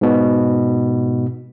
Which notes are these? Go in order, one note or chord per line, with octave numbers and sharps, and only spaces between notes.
G#2 B2